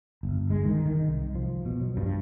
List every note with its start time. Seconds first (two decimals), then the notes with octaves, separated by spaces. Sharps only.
0.23 G1
0.50 G#3
0.65 D#3
0.86 D#3
1.08 C2
1.35 F3
1.66 B2
1.80 F#3
1.97 G2